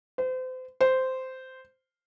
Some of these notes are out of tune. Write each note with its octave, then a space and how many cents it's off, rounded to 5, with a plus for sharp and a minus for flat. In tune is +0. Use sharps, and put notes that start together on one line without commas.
C5 -35
C5 -10